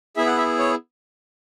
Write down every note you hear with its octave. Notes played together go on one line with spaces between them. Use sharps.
B3 E4 G#4 E5
F#5
E5
C#5